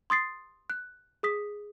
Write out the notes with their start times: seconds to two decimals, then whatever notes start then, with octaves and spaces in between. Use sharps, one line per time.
0.10 C6 D#6 A6 C7
0.70 F#6
1.23 G#4 D#6 B6